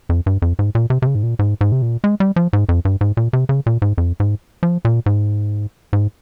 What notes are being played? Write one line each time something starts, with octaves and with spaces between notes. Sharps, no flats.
F2
G2
F2
G#2
A#2
C3
C3
C#3
G#2
A#2
G#2
G#2
C3
A#2
G#3
G3
F3
G#2
F2
G2
G#2
A#2
C3
C#3
A#2
G#2
F2
G#2
F3
A#2
G#2
G#2